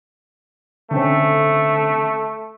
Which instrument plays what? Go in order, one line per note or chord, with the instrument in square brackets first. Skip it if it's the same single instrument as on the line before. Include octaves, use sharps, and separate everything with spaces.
[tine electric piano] D3 C4 C#4 [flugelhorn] A3